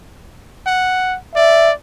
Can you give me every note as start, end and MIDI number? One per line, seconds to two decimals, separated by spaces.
0.66 1.17 78
1.36 1.73 74
1.36 1.70 76